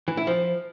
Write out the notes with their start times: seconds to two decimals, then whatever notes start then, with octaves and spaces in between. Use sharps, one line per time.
0.08 E3
0.17 E4
0.27 F3